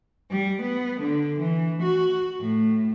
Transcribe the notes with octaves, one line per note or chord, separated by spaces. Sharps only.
G3
B3
D3
E3
F#4
A2